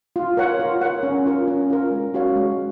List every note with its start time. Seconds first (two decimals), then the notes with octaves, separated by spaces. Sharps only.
0.16 F4
0.37 A#4 C#5 F#5
0.60 F4
0.81 A#4 C#5 F#5
1.03 C#4
1.26 F4 A#4
1.48 C#4
1.70 F4 A#4
1.91 G#3
2.14 C#4 F#4 C#5 F5
2.36 G#3